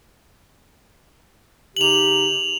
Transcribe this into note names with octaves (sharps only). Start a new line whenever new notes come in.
C#3 D#4 G4 F7 F#7